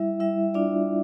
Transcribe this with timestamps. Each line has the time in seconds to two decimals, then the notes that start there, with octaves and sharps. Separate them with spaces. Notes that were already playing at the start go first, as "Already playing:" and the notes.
Already playing: G3 E4 E5
0.20 G3 E4 E5
0.54 D4 F4 D5